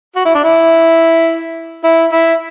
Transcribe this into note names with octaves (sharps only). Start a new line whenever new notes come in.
F#4
E4
D4
E4
E4
E4